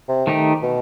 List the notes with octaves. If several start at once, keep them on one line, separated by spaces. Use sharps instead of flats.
C3
D#3 A3 D#4 G4
B2